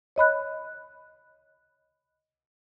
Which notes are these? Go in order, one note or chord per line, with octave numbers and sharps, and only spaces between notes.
C#5 D#5 B5 F#6